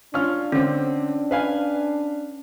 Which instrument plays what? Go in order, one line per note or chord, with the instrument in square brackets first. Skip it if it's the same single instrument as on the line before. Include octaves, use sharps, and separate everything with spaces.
[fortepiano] C#4 F4 F6 [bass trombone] D4
[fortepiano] D3 C4 [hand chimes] C#4
[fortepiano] B4 F5 G#5